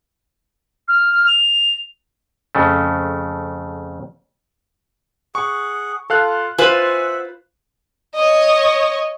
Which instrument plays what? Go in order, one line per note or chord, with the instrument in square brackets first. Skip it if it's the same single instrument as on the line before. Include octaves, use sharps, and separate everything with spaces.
[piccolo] F6
F7
[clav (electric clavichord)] F2 C#3 A3
[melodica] G#4 F#5 [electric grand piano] C#6
[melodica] F4 [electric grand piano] A4 F5 F#6
[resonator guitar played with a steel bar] F4 B4 C5 [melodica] E5 F#5 [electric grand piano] G#5
[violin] C#5 D#5